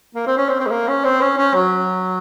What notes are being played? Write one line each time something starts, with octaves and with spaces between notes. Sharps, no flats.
A#3
C4
C#4
C4
C4
G#3
A#3
C#4
C4
C#4
C#4
F#3